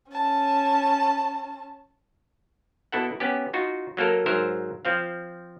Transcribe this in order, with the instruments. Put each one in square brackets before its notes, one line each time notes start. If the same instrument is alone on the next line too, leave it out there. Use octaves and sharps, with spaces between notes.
[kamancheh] C#4 A5
[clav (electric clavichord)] B2 E4 A4 F#5
B3 C#4 G4
D#4 F4 F#4
F#3 A#3 A4 A#4
G#2 F#3 A#4 C5 E5
F3 C4 F5